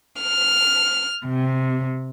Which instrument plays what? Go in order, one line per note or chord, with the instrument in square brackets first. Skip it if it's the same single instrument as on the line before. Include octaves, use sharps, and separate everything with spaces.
[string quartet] F6
C3